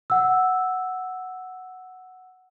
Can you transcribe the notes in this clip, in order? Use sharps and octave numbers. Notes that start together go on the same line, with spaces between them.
F#5 E6